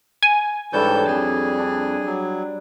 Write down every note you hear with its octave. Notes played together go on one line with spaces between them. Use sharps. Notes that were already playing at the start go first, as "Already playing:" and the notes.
G#5
G#2 E3 G3 D4 A4 C#5 G6
F2 G#4
D4
F#3